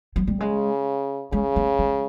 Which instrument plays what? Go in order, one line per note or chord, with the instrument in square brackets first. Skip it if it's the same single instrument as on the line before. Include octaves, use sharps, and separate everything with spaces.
[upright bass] F#3
G3
[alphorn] C#3 [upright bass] G#3
[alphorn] C#3 [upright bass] G#3
[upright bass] A3
G#3